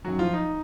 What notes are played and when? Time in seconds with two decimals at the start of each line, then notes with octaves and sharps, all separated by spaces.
0.05 F#2 D#3 F#3 F#4
0.19 F3 F4
0.33 D#4